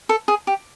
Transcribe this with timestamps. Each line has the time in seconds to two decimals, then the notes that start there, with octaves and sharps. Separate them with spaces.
0.09 A4
0.28 G#4
0.47 G4